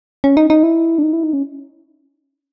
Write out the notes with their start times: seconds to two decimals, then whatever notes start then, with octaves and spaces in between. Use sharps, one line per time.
0.24 C#4
0.37 D#4
0.50 D#4
0.63 E4
0.98 D4
1.03 D#4
1.13 E4
1.23 D#4
1.33 C#4